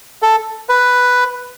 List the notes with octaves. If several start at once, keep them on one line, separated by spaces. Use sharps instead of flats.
A4
B4